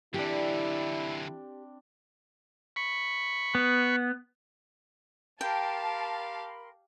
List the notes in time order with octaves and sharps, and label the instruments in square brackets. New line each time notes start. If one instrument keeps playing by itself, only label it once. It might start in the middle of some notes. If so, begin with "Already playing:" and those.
[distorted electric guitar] D3 E3 [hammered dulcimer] C4 D4 [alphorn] E4 [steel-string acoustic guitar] G4
[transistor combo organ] B5 C#6
[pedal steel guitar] B3
[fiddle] G4 F5 [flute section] A#4 B5 C6 [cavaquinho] G5 [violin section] A5